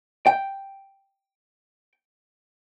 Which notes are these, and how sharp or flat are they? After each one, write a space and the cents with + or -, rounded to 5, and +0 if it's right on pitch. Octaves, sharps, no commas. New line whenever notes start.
G5 +0